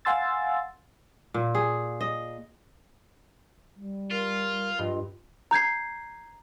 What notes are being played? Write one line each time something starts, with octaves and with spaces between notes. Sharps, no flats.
F5 F#5 G#5 C6 E6 A6
A#2
G#4
D#5
G3
F4 A#4
G2 F4 D#5
A#5 G6 G#6 C7